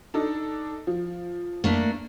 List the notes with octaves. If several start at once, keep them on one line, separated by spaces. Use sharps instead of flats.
D4 D#4 A4
F3
A3 A#3 D4